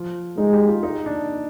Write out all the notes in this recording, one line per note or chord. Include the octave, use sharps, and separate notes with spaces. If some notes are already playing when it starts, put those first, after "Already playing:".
Already playing: F3
G#3 D#4
G4
F4
D#4
D4